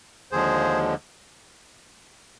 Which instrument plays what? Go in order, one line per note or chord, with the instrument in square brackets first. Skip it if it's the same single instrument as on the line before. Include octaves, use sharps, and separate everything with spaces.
[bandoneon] D#2 D3 F3 G#3 G#4 C5